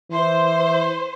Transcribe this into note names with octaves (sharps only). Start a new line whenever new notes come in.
E3 C5